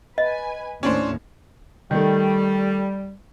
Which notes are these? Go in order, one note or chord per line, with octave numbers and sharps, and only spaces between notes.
B4 D#5 G#5
D#2 A2 C#4 D4 C5
D#3 G3 A3